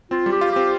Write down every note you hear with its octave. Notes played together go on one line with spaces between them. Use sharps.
C4 F4
G3
G4
F4
C4 G4